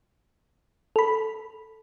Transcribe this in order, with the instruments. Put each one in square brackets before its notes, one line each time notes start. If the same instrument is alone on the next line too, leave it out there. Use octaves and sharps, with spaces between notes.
[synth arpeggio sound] A4 B5